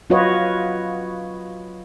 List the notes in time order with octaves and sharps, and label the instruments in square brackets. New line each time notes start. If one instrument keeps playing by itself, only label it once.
[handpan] F#3 F4 F#4 B4 C#5 D#5